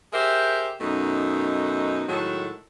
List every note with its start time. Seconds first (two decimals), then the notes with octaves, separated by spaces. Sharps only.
0.13 G4 G#4 A#4 C5 E5
0.80 F#2 B2 A3 D#4
2.07 A2 D#3 F#3 G#3 F#4 A4